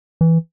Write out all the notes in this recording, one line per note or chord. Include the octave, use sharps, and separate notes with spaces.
E3